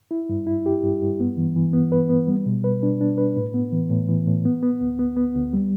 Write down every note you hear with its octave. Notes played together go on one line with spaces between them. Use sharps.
E4
G2
E4
G4
G2
G2
B3
E3
E3
B3
B4
B3
G3
B2
B4
D4
D4
B4
A2
B3
E3
A2
E3
A2
B3
B3
D2
B3
B3
D2
G3